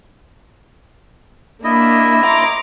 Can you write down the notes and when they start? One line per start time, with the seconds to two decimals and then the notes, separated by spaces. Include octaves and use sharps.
1.64 A#3 D4 E4 D#5 E5
2.25 A#5 C6 D6